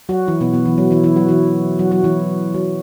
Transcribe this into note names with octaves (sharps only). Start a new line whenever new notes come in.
F#3 F#4
E3 E4
B2 B3
B2 B3
E3
F#3
E3 E4
E3 E4
F#3 F#4
E3 E4
F#3 F#4
F#3 F#4
E3 E4
F#3